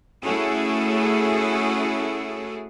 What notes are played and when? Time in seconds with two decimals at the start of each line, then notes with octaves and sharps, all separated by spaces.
0.23 A3 C#4 E4 F#4 G#4 A4